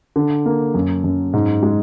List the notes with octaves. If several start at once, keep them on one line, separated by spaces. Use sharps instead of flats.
D3
A#3
F#2
F#2
G#2
G#3